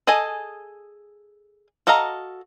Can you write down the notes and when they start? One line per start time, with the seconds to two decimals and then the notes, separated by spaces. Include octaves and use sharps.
0.07 G#4 A4 D#5 G#5
1.87 F#4 A4 D#5 F5 A#5